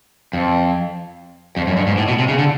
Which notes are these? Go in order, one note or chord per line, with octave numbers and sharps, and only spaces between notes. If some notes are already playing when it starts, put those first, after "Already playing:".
F2
F2
F#2
G2
G#2
A2
B2
C3
C#3
D3